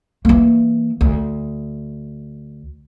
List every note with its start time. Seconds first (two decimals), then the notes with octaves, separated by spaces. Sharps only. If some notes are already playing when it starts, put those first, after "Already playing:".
0.25 E3 A#3
1.01 D2